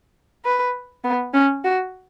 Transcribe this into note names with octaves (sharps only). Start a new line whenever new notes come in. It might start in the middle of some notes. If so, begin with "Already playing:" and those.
B4
B3
C#4
F#4